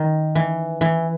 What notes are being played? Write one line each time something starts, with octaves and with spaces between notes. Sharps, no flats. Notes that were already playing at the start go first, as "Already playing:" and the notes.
Already playing: D#3
E3
E3